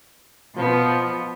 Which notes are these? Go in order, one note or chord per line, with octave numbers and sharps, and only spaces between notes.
B2 F3 B3